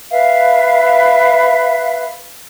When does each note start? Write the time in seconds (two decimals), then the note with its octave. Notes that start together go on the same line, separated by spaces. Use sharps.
0.10 B4 E5 F5